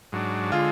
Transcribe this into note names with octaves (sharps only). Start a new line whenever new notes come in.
G#2 F#3 D4
D3 G#3 F4